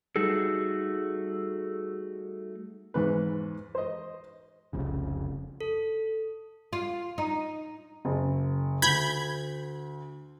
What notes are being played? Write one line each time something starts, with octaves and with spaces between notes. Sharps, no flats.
G3 A3 D#4 F#4 G#4 A4
E2 G#2 B4
C5 D#5
F1 C2 F2 C#3
A4
F4
D#4
F#1
D2 B5 G6 G#6